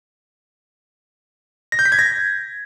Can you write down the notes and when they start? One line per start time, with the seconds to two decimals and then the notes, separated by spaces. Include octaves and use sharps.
1.72 A#6
1.79 G6
1.85 B6
1.92 G#6
1.99 A#6